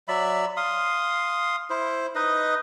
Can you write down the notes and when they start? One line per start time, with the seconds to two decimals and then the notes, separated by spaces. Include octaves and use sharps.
0.08 F#3 D5 E5 B5
0.57 F5 C6 D#6
1.70 E4 C5
2.15 D#4 B4 D#5